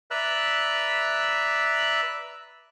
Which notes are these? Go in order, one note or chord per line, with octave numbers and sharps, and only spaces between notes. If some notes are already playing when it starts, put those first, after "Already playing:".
B4 D5 E5 A#5 E6 F#6